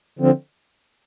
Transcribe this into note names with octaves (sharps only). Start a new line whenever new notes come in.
D3 F3 C4